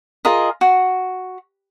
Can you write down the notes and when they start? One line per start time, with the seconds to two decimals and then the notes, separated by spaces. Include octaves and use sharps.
0.25 F4 G#4 A#4 D#5
0.61 F#4